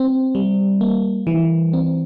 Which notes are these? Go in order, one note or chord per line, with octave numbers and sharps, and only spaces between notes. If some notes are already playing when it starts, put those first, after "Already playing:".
Already playing: C4
G3
A#3
E3
C4